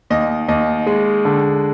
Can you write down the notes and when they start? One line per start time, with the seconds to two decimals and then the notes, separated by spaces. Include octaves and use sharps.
0.10 D#2 D#5
0.48 D#2 D#5
0.87 G#3
1.25 D3